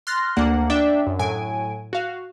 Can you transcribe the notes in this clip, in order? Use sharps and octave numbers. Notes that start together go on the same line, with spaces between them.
C6 F6 F#6 A6 A#6
D2 A#3 D4 F#5
D4 D5 E5 G5
F#2
A2 F#3 G#5 D7
F#4 F5